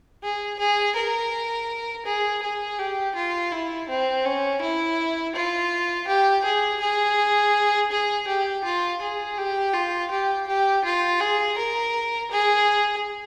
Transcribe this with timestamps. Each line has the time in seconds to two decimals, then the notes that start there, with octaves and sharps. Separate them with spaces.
0.23 G#4
0.59 G#4
0.96 A#4
2.06 G#4
2.42 G#4
2.79 G4
3.16 F4
3.52 E4
3.89 C4
4.25 C#4
4.61 E4
5.36 F4
6.08 G4
6.44 G#4
6.81 G#4
7.91 G#4
8.27 G4
8.64 F4
9.01 G#4
9.38 G4
9.74 F4
10.11 G4
10.47 G4
10.85 F4
11.21 G#4
11.57 A#4
12.31 G#4